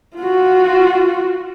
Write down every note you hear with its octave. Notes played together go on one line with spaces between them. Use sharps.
F4 F#4